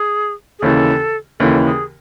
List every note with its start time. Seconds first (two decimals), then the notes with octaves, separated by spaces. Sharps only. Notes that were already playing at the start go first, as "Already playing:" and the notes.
Already playing: G#4
0.59 G#4
0.62 D#2 C#3 E3 A4
1.40 D#2 C#3 E3 A4
1.65 G#4